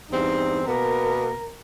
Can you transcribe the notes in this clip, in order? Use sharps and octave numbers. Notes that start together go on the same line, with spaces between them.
E2 G2 C4 D#4
B2 A#3 B3 A#4